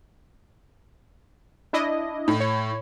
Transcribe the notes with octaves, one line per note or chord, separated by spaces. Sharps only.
D4 E4 D#5
A2
C#5